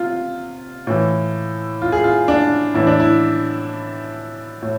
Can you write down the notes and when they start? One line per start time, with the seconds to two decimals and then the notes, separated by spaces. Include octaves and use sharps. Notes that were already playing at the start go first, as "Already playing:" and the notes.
Already playing: C3 F4
0.87 A2 E3
1.82 F4
1.92 G#4
2.04 F4
2.28 D4
2.74 A2 E3 E4
2.87 D4
3.00 E4
4.62 A2